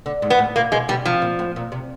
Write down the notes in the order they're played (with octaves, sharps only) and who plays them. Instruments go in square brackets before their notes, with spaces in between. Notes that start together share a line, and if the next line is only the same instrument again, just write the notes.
[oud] D3
G#2
[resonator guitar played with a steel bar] B3
[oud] A2
[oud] A#2 [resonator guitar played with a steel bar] A#3
[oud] B2 [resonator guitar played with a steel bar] G#3
[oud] B2 [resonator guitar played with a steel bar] G3
[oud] C3 [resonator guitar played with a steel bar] F3
[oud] A#2
A2
A#2
C3